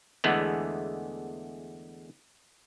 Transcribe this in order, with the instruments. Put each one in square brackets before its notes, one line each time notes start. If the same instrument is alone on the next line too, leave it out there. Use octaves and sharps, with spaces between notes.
[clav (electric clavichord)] E2 D3 G#3 A3 B3